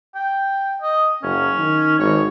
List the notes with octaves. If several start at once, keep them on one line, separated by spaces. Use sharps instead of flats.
G5
D#5
F#1 C#4
D#3
G#1 C#5